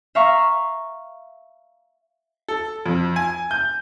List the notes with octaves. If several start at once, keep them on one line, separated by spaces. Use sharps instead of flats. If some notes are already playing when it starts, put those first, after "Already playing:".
E5 F5 A#5 C#6
A4
F2
G#5
G6